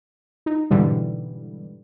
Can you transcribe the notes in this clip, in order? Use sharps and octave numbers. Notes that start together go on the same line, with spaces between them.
D#4
G#2 B2 D3 E3 G3